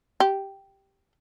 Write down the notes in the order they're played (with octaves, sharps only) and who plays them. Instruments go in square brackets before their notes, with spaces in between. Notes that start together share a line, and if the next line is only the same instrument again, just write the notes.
[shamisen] G4